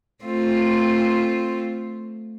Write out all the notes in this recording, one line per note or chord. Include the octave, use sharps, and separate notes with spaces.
A3 C4 F4